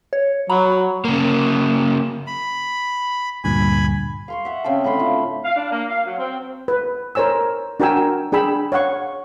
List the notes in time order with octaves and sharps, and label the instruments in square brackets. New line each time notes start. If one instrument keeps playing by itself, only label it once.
[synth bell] C#5
[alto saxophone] F#3 [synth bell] A#5 B5
[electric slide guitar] C#3 A#3
[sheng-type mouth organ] B5
[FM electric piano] D2 G2 A#2 [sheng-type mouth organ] G#5 B5
[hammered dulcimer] F5 C6 C#6
E5 F#5
C#3 C4 F5 A5
A2 D3 B5 C6
F4
[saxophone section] F5
D4
A#3
F5
F#3
C4
[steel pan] B4
A#4 C5 C#5 G#5 E6
D4 F#4 A#4 G5 G#5 E6
D4 G#4 G5 B5 E6
C#5 F5 F#5 C#6